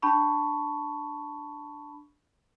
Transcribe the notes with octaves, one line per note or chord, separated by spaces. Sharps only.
D4 A5 B5 C#6